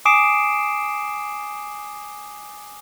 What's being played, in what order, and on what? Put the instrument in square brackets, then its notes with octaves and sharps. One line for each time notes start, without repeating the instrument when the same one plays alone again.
[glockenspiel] G#5 D6 D#6 C7 D7 E7